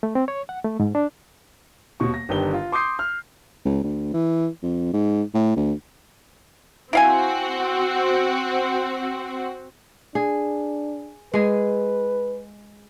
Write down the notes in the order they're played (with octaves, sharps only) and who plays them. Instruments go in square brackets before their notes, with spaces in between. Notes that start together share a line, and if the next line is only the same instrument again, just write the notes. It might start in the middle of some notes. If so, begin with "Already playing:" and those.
[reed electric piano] A3
C4
C#5
F#5
A3
G#2
D4
[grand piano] D#1 B2 C#6
A#6
G1 D#3 D4 G4 B4 G7
F4
C6 D6 D#6 G6 C7
F6
[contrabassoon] C#2
D2
E3
F2
G#2
A2
D2
[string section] C4 F#4 [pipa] E4 F5 G#5
[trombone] D4 [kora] G#4
[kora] G#3 G#4 [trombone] B4